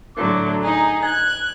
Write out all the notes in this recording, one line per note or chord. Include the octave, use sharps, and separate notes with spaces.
A2 D3 F#3 D6
D#4 G#4 A#5
F#6 G#6